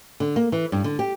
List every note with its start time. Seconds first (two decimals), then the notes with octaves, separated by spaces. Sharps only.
0.20 D3
0.36 A#3
0.52 E3
0.72 G2
0.84 D3
0.99 G4